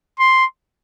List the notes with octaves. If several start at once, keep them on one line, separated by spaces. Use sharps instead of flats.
C6